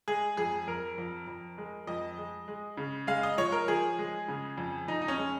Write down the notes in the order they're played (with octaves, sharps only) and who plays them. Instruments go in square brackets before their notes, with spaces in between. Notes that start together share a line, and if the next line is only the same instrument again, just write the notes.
[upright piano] G#3 G#4
F2 G#4
F2 A#4
F2
F2
G#3
F2 D#5
G#3
G#3
C#3
G#3 F5
D#5
F3 C#5
A#4
F3 G#4
G#3
C#3
F2
F2 D#4
D#4
C#4
G#3